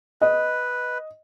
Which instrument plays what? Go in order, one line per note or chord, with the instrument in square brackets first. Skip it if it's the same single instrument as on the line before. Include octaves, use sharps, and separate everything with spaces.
[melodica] B4 [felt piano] D#5